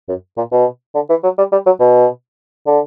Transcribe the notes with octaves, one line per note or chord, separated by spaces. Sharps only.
F#2
A#2
B2
D3
E3
F#3
G3
G3
F#3
B2
D3